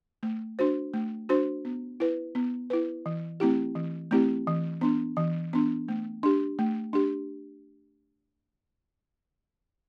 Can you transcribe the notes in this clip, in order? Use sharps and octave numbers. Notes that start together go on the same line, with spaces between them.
A3
D4 F#4 C5
A3
D4 F#4 C5
B3
E4 B4
B3
E4 B4
E3
A3 C4 E4 G4
E3
A3 C4 E4 G4
E3
B3 D4
E3
B3 D4
A3
D4 G4
A3
D4 G4